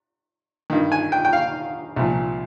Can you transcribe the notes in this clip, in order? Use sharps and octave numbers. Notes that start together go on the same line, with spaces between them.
G2 D#3
G#5
G5
G5
F5
C2 A#2 F3